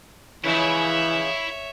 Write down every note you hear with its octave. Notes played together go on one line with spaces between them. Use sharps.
C#3 E3 F3 G#3 E4 C#5 E5